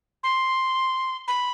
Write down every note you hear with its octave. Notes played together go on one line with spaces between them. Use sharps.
C6
B5